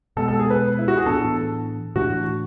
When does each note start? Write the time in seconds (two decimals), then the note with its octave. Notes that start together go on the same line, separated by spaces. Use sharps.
0.17 B2 G#3 B3 A4
0.28 A4
0.39 G#4
0.50 B4
0.79 E4
0.88 F#4
0.97 G#4
1.06 A2 E3 B3 D4 A4
1.96 A2 E3 A3 D4 F#4